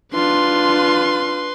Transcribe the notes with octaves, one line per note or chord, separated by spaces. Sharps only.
D4 F4 B4 C6